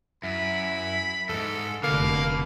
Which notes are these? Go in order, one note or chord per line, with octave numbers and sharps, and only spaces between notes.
F#2 E4 B5
F2 G#2 A4
F1 B2 D3 A#3 F5